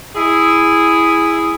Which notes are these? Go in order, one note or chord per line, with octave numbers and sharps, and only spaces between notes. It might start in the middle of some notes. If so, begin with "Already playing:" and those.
E4 G#4